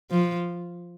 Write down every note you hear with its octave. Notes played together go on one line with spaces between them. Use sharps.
F3